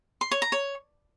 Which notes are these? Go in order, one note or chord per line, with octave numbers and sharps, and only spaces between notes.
C6
C#5
A#5
C#5